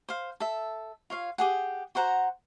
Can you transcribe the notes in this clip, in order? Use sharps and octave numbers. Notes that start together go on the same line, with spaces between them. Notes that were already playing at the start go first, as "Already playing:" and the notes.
C5 F5
A4 E5
F4 C#5 F5
G4 G#4 F#5
F#4 C5 F#5 A#5